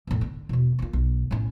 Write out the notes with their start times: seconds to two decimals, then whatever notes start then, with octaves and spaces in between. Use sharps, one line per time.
0.07 E2 A2
0.21 D3
0.49 E1 B2
0.79 A#3 F4
0.93 B1
1.31 A2 C#4